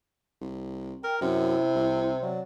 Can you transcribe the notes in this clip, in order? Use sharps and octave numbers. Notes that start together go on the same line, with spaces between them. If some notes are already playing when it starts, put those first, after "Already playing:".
C2
A#4 G5
F#2 C3 E4
C2
F#3 D5